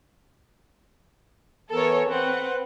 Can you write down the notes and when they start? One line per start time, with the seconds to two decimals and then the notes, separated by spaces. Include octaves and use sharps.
1.72 E3 B3 A4 A#4 C#5
2.08 C4 B4 F#5